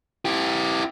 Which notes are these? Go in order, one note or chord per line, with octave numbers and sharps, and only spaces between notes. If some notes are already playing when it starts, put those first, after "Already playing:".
E4 G4